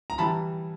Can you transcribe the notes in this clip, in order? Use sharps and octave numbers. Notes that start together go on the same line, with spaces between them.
A#5
E3 G3 A5 B5